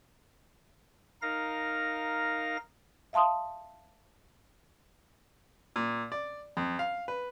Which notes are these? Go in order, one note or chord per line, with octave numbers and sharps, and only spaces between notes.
D#4 A#4 F5 A#6
E5 F5 A5 C6 D#6
A#2
D5
F2
F5
B4